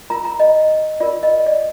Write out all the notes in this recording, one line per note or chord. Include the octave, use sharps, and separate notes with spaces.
F4 A#4 A#5
A#5
D#5
F4 A#4 D5
D#5
D5